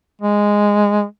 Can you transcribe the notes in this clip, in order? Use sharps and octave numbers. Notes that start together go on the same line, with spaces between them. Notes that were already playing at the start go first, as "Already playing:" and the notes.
G#3